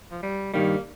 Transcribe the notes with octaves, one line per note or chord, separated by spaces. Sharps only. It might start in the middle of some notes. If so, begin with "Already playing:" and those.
F3
G3
G2 D#3 G3 A#3